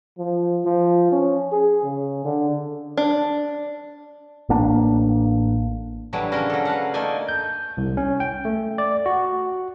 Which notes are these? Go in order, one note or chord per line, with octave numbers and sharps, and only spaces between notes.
F3
F3
C#4
G#4
C#3
D3
D4
A1 A#3 D4
A2 E3 F#3 G3 D4
C#3 F3 A#3 C#4 D4 A#4
F#3 A4
A4 B4 F5 F#5
A3 A#3 D#4 D5 G#5
G6
C2
C#4
G5
A3
D5
F#4